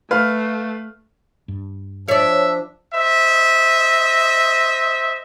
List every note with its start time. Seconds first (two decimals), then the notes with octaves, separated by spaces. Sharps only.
0.11 A3 B4 F5 F6
1.48 G2
2.08 F3 D4 C#5 D5 E5
2.93 C5 D#5 E5